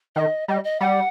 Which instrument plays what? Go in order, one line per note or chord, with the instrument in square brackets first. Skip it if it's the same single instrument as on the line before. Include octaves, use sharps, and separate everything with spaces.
[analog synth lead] D#3 [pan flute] D#5
[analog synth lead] G3 [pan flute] D#5
[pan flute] D#5
[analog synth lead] G3 [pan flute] F#5